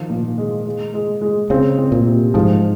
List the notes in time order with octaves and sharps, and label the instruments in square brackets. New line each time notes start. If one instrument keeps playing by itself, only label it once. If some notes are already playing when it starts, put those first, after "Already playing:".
Already playing: [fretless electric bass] D#3 [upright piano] F3
[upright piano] A#2
G#3
G#3
G#3
G#3
[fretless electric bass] C#3 [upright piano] C4
[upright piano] C4
[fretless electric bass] A#2
[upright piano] C3
[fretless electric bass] G#2 [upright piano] F3